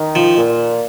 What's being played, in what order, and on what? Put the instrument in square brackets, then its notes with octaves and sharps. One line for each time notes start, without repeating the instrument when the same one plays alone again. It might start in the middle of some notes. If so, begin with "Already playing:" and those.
Already playing: [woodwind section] D#3
[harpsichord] F3
[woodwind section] A#2